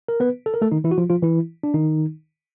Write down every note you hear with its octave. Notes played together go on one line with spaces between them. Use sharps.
A#4
B3 B4
A4
A#4
A3 A4
D#3 D#4
E3 E4
F#4
F3 F4
F3 F4
E3 E4
D4
D#3 D#4